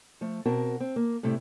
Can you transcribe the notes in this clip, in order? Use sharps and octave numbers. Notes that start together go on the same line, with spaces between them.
F3 A3
B2 C4 F#4 A#4 A5
C4
A#3
A2 C3 G3 A3